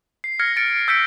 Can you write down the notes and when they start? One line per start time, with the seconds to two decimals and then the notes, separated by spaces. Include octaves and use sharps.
0.24 C7
0.40 F6 G#6 A#6 C#7
0.56 A6 C#7 D7
0.88 E6 G6 B6 C#7 D7